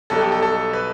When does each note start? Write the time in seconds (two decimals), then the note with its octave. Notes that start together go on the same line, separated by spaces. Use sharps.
0.10 B1 B2 G3 A4
0.21 G4
0.32 A4
0.43 A4
0.73 B4